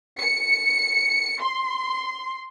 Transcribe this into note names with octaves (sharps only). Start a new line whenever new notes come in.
C#7
C6